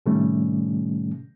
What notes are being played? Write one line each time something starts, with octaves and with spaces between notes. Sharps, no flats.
A2 C3 D#3 G3 A3 C#4